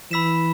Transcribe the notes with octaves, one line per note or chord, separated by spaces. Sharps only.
E3 B5 E6 B6 E7